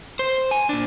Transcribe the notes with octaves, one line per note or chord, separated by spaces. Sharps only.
C5
G#5
A#2 D4